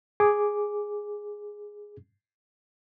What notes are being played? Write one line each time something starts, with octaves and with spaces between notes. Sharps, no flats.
G#4 D6